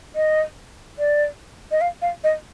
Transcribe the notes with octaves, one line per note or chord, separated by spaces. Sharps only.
D#5
D5
D#5
F5
F5
D#5